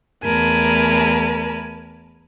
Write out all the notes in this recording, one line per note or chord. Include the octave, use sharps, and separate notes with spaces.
E2 A3 A#4 G#5 A5 B5